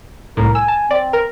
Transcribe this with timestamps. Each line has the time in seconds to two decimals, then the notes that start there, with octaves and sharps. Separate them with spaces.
0.37 C2 A2 A#4
0.55 G#5 E6
0.68 A5
0.91 C4 D5
1.13 A#4